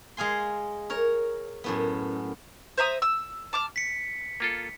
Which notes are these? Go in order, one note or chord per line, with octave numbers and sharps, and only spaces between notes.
G#3 G#4 F5 G#5 C6
A#4 C#5 A#5
F#2 A2 B3
C5 E5 A#5 D#6
E6
A5 D6 F6
B6 C#7
A#3 F4 A4